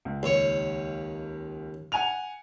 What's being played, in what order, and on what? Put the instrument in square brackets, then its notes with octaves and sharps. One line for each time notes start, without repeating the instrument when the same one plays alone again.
[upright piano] C#2
[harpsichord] D#2 C#5
[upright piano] F#5 G#5 F7